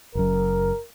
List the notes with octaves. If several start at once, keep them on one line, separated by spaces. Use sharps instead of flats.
F#1 F#2 A#4